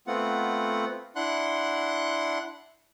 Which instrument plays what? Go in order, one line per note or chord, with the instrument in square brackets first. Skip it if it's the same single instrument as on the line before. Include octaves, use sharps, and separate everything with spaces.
[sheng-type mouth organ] A3 B3 C4 F4 F#5
D4 E4 F#5 C6 F#6